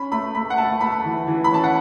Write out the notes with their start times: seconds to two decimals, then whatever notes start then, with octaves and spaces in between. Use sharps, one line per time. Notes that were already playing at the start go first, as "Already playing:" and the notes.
Already playing: C#4 B5
0.12 A3 B5
0.35 A3 B5
0.50 F#5
0.58 A3 A5
0.81 A3 B5
1.04 E3
1.27 E3
1.44 B5
1.51 C#4 A5
1.64 F#5